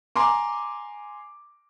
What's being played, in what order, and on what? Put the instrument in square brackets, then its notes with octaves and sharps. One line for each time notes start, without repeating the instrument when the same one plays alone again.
[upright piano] G#5 A#5 C6 D6